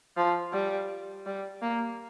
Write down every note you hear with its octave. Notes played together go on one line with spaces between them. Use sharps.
F3
G3
G3
A#3